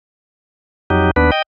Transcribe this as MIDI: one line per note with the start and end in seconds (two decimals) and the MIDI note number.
0.90 1.11 41
0.90 1.11 54
0.90 1.11 63
0.90 1.11 67
1.16 1.31 39
1.16 1.31 59
1.16 1.31 62
1.16 1.31 71
1.32 1.42 75
1.32 1.42 79